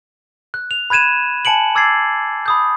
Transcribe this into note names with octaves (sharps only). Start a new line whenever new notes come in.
F#6
F7
B5 F#6 G#6 D#7 E7
G#5 A5 C#7 D7 F#7
D6 E6 G#6 A6 C7
B5 D#6 G6